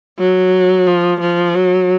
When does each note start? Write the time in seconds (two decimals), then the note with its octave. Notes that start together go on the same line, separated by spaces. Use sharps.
0.19 F#3
0.87 F3
1.21 F3
1.55 F#3